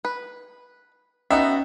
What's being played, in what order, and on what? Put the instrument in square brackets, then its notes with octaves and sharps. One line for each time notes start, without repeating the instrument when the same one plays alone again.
[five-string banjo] B4
[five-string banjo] B3 D#4 F#4 [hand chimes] C#4 D#5 G5 [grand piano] E5